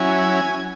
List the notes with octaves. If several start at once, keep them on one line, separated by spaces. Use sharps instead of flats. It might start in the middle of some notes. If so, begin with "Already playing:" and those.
Already playing: F#3 C#4 E4 G#5